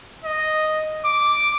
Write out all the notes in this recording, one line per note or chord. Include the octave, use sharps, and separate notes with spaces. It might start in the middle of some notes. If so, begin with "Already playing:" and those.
D#5
D6